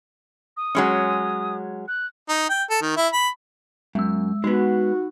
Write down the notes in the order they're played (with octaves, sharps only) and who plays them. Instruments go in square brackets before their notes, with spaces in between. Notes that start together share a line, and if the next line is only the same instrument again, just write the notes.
[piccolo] D#6
[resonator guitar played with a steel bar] F#3 G#3 C#4
[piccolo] F#6
[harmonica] D#4
G5
A4
D#3
E4
B5
[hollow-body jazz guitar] F#2 [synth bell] G#3 E6
[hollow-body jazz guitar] G#3 B3 [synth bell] D#4 [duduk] F#4